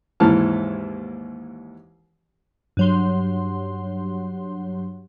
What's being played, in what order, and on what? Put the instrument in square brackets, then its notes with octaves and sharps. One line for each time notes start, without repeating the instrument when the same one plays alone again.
[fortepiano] D#2 G#2 E3 E4 A5 F6
[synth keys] G2 F#3 C6